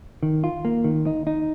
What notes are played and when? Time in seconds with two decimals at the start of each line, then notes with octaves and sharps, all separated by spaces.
0.23 D#3
0.44 F4
0.65 A#3
0.84 D#3
1.06 D#4
1.27 D#4